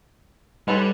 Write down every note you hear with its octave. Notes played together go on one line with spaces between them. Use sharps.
G3 G#3 C#4 A4 B4